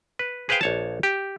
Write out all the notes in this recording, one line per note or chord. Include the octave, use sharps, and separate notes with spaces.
B4
G#4 B4 C5 F5 G5
A#1 C#5 A5
G4